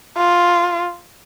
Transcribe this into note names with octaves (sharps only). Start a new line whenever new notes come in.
F4